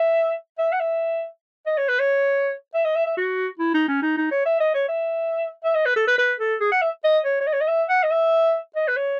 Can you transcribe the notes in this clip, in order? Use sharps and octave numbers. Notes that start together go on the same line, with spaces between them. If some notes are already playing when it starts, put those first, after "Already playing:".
Already playing: E5
E5
F#5
E5
D#5
C#5
B4
C#5
E5
D#5
E5
E5
F#4
E4
D#4
C#4
D#4
D#4
C#5
E5
D#5
C#5
E5
E5
D#5
B4
A4
B4
B4
A4
G#4
F#5
E5
D#5
C#5
C#5
D#5
C#5
D#5
E5
F#5
D#5
E5
D#5
B4
C#5